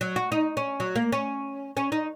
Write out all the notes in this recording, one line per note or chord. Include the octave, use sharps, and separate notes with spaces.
F#3
F#4
D#4
C#4
F#3
A#3
C#4
C#4
D#4